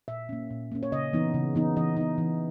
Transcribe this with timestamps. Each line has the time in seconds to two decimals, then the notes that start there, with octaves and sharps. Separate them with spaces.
0.08 A#2 E5
0.29 A#3 C#4
0.50 A#2
0.72 A#3 C#4
0.83 C#5
0.92 C#3 D#5
1.13 E3 B3 D#4
1.34 C#3
1.55 E3 B3 D#4
1.76 E3 D#5
1.97 B3 D#4
2.18 E3